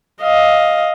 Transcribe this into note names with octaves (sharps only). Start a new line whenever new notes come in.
D#5 F5